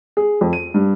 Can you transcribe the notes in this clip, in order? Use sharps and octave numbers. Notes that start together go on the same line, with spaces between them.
G#4
F2
D#7
G2